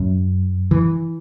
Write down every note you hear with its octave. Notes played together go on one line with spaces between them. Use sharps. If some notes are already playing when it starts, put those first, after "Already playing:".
Already playing: F#2
E3